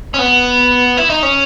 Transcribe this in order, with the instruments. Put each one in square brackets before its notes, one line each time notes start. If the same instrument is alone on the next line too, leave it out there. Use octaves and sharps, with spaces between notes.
[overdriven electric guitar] C#4
B3
E4
D#4
C#4